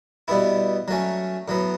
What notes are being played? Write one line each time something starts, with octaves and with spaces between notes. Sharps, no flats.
B2 G3 B3 E4
F#3 A3 C#4
A2 F#3 B3